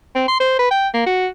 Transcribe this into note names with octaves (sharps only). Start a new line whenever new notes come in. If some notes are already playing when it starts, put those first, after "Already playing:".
C4
C6
C5
B4
G5
A#3
F#4